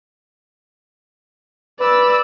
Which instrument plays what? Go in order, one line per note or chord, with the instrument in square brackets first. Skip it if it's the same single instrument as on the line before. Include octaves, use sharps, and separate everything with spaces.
[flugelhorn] B4 [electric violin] D5 E6